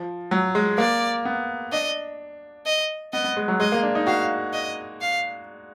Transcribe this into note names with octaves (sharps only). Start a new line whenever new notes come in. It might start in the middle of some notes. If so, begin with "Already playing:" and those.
Already playing: F3
F#3
G#3
A#3 D5
B3
D4 D#5
D#5
B3 D#5
B3
G#3
F#3
G#3 D#5
A#3
D4
D#4
F#4 F5
D#5
F5